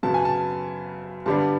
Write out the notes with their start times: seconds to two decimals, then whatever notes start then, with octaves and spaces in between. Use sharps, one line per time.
0.03 F#2 C#3 F#3 B3 A5
0.14 G#5
0.25 A5
1.26 G2 D3 G3 B3 D4 A5